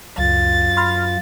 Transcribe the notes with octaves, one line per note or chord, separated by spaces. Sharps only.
C#2 F#2 F4 A6
B5 C6 F6